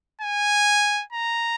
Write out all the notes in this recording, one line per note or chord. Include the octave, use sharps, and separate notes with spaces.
G#5
A#5